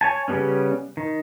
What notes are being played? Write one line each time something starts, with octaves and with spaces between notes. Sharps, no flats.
C#5 G#5 A5
C#3 F3 G3 B3 C#4
D#3